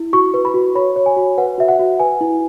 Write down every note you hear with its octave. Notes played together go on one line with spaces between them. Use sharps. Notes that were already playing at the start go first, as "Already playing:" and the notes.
Already playing: E4
F#4 C#6
B4
B5
F#4
C#5 B5
C#5
G#5
F#4
B4 F#5
F#4 E5
F#5
F#4
B4 G#5
E4